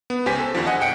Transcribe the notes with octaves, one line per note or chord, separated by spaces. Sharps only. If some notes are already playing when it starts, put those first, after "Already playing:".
B3
C#2 G4 C5 G#5 B6
A4
E2 D3 F3
D#5 F#5 G#5
A#1 F#5 G5 C#7 D7